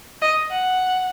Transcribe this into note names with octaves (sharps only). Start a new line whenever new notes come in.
D#5
F#5